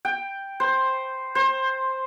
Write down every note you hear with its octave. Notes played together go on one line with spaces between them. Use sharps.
G5
C5
C5